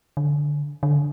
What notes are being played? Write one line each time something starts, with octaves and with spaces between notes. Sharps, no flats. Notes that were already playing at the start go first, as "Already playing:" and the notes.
D3
D3